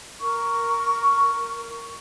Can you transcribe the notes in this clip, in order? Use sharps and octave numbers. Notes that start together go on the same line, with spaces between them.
A#4 C#6